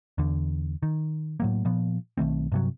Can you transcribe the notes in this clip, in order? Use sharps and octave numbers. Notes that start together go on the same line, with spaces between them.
E2 D3
D#3
A2 F#3 A#3
A#2 F3 B3
B1 D#3 A3 C4
G2 C3 F#3